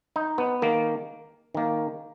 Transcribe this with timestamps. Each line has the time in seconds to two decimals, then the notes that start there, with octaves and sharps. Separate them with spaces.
0.16 D#4
0.38 B3
0.62 D#3 A#3
1.55 D#3 A#3